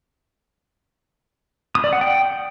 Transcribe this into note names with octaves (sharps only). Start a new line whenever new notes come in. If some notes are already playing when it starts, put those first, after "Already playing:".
D#6
D5
F#5
G5